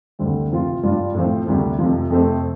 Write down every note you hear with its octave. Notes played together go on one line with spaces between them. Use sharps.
D2 D3 G3 C4
C3 F3 C4 F4
G2 G3 D4 F4
A2 F3 C4
D2 C3 G3
F2 C3 F3
F2 C3 A3 C4